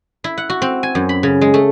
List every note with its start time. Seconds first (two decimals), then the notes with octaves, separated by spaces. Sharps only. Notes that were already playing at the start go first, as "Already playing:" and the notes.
0.24 E4
0.38 F#5
0.50 F#4
0.62 C4
0.83 G#5
0.95 F#2
1.09 B5
1.23 C#3
1.41 G#3
1.54 A3